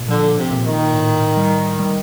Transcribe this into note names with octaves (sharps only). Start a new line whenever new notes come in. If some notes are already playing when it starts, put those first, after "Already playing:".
Already playing: A#2
D3 F3
C3
A#2
D#3
A2
G3
G3